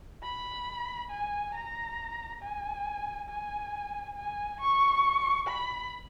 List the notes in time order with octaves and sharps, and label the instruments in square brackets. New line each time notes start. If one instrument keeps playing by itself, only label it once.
[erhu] B5
G#5
A#5
G#5
G#5
G#5
C#6
B5